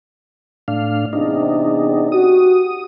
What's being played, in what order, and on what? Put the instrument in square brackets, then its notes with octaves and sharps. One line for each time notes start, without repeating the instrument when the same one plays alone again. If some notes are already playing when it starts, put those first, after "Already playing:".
[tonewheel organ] A2 D4 F5
[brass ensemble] E2 C3 [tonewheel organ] D4 D#4
[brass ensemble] F#4 G4 [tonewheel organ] D#6